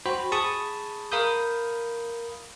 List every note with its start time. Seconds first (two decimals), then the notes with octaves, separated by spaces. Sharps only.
0.06 F#4 C5 G5 B5
0.32 G#4 A5 B5 C#6 D#6
1.12 A#4 F5 B5 D#6 G6